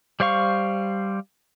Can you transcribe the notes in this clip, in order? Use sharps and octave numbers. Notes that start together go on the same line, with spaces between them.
G3 C5 F5 C#6